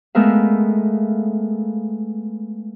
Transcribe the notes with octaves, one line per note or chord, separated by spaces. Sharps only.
G#3 A3 B3 A#4 E5 F5